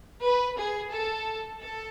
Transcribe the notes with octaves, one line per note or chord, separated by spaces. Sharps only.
B4
G#4
A4
A4